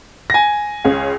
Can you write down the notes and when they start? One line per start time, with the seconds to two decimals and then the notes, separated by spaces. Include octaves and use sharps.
0.30 G#5 A#6
0.84 C#2 C#4 G#4